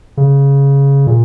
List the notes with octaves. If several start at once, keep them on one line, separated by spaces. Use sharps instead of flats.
C#3
A#2